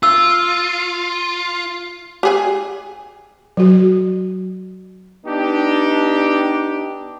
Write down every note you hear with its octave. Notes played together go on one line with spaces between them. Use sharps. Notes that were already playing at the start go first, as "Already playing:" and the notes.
F4 E6
G4 G#4 G#5
F#3 F#4
B3 D4 D#4 G4